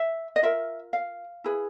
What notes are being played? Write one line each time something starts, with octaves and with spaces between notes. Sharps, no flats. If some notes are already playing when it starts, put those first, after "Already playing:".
Already playing: E5
D#5
F4 A#4 E5
F5
E4 G#4 B4